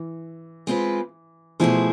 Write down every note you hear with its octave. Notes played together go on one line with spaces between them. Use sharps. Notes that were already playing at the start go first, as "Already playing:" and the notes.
Already playing: E3
G#3 C4 F4 B4
B2 F3 A3 E4 G#4 C5